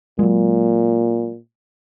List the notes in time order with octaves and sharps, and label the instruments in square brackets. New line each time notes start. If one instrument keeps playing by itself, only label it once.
[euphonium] A#2 [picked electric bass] F#3 G#3